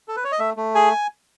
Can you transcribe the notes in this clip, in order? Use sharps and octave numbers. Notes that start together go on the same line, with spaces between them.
A4
B4
C#5
D#5
A3 E5
A3
G#4 G#5